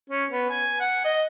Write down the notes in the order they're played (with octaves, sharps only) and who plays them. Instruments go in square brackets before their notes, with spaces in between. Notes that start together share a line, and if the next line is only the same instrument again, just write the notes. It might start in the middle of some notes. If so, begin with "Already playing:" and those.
[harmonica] C#4
B3
G#5
F#5
D#5